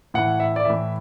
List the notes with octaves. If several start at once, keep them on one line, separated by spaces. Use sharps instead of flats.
A2 E3 F#5
E5
D5
A2 E3 E5